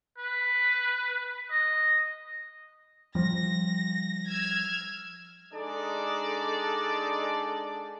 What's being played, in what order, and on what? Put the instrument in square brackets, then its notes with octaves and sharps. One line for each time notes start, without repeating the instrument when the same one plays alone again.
[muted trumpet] B4
D#5
[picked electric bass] F3 G3 [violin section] A#6
[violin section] E6 F6 G#6
[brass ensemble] G#3 D4 D#4 A4 D5